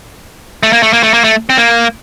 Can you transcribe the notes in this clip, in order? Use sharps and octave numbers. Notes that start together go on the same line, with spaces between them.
A3
A#3
A3
A#3
A3
A#3
A3
C4
A#3